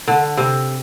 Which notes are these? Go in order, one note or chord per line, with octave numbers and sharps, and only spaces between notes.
D3
C3